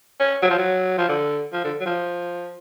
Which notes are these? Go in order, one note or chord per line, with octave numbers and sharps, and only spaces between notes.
C#4
F#3
F3
F#3
F3
D3
F3
D3
F#3
F3